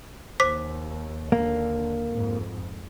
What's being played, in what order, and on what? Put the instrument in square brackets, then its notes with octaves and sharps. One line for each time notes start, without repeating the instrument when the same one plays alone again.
[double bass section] D#2 [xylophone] C5 D6 B6
[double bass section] D#2 D3 [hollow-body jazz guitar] A#3
[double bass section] F2 G#2